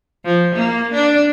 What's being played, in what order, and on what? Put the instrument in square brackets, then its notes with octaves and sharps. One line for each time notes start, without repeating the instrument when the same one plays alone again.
[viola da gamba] F3
A#3
D4